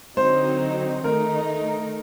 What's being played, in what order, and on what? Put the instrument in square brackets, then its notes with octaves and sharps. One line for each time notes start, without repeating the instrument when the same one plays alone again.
[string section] D3 F#3 C4 D#4 [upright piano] C5
[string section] D#3 A3 D#4 [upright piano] A#4